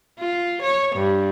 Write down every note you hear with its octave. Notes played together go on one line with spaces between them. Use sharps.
F4
C#5
G2